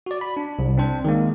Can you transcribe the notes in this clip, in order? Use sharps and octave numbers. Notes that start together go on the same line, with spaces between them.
F#4 D5
B5
D4
C2
C4 D4 C5
D#3 G#3 A#3